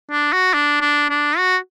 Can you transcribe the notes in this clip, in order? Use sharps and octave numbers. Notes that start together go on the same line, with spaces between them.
D4
F#4
D4
D4
D4
F#4